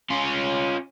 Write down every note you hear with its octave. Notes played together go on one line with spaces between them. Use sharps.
C#4 F4